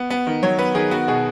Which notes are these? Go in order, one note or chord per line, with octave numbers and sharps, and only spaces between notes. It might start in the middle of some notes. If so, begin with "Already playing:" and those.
Already playing: B3
B3
D#3
F#3 C#5
B3 B4
D#3 G#4
B3 F#4
B2 G#4